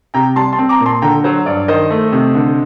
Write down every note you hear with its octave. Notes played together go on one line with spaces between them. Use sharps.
C3 G5 A#5
G3 A5 C6
A5 C6
C4
A#5 D6
A#2
A5 C6
D3 G5 A#5
F#3 C5
G2 D5
D#3 C5 D#5
A3
C3
D3